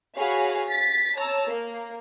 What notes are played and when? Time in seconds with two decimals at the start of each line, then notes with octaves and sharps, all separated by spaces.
0.17 F#4 G#4 C#5 F5 B5
0.69 A6 B6
1.17 C#5 A5 A#5 E6
1.47 A#3